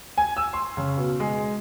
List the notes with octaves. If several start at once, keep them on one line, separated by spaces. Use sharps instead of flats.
G#5
E6
C6
C#3
B2
G#3